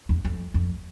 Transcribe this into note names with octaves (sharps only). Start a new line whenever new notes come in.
E2
F2
F2